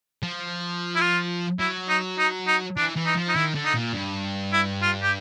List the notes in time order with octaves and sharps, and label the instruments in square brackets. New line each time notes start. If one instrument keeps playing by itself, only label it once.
[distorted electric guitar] F3
[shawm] E4
F4
[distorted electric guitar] F#3 [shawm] E4
[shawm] D#4
D#4
D#4
[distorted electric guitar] E3 [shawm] D4
[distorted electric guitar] E3
[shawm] D#4
[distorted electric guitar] F3
[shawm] D#4
[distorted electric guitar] D#3 [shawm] E4
[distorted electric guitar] D3
[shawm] D#4
[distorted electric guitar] A#2
G2
[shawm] E4
F4
G4